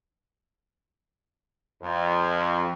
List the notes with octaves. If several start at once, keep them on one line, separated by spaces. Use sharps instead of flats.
F2